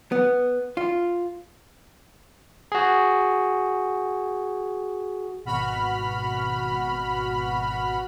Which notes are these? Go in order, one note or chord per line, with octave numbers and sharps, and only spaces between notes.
B3
F4
F#4 G#4
G#1 B2 F#4 B5 F6